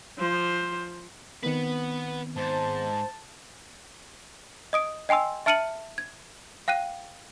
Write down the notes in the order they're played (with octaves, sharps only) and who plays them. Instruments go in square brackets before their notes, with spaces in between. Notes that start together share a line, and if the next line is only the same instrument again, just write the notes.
[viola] F3 C5
[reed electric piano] D#3 B3 C4 [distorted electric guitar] B4 F#5
[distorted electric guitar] G#2 [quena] C5 [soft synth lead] A5
[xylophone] D#5 D#6 D7
D#5 G5 G#5 C6 E6
E5 A5 F6 C#7 D#7 F#7
G#6
F5 G5 F#6 D#7